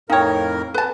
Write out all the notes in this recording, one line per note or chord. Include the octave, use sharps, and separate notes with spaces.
F2 A2 D#4 A#4 C#5 F5 G5 C#6
B4 A5